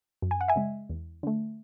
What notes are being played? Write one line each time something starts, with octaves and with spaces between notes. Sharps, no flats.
F#2
G#5
F#5
E5 G#5
C#3 G#3
E2
D3 A3